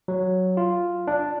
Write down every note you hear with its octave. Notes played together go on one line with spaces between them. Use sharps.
F#3
F4
D4